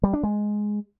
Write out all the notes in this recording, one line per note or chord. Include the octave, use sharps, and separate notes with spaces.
G3
D4
G#3